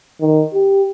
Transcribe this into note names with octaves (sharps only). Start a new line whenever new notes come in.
D#3
G4